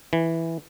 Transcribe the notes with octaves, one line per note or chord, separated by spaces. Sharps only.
E3